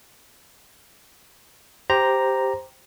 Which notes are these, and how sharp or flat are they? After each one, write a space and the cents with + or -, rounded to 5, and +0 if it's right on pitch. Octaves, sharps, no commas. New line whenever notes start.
G4 +0 C5 +0 A#5 +0